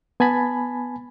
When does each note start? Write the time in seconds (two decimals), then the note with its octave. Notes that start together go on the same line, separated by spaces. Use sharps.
0.20 B3 G#5 A5 B5